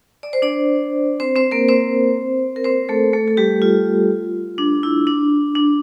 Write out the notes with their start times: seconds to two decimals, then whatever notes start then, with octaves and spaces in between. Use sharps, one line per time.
0.23 D5
0.33 C5
0.42 D4 D5
1.20 C4 C5
1.35 C4 C5
1.51 A#3 A#4
1.69 C4 C5
2.56 A#4
2.64 C4 C5
2.89 A3 A4
3.13 A3 A4
3.28 A4
3.37 G3 G4
3.62 F4
4.58 D4
4.83 E4
5.07 D4
5.55 D4